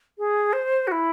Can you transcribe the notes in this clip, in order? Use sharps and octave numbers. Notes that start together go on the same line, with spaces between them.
G#4
C5
F#4
E4